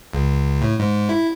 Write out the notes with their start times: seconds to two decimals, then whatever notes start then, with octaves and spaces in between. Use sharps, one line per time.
0.13 C#2
0.62 A2
0.79 G#2
1.09 E4